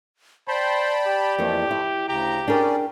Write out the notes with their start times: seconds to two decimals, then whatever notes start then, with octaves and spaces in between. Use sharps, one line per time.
0.48 C5 D5 G5 A5 B5
1.07 G4
1.38 F2 E3 F3 A3 A#3
1.71 E4
2.08 D2 C#3 G4 A#5
2.48 C#4 D4 G#4 A#4 D5 G5